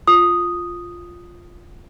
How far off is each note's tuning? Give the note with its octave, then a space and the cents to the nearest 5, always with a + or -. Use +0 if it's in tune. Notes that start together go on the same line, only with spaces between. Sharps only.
F4 +0 D#6 -5